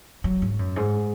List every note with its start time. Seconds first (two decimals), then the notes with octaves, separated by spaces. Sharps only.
0.24 F#3
0.42 G#2
0.59 F#2
0.76 G#2